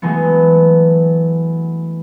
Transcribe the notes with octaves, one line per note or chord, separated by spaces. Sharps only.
E3 F#3 G#3 A3 B3